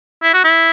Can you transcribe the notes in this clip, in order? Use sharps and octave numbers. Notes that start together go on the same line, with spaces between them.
E4
F#4
E4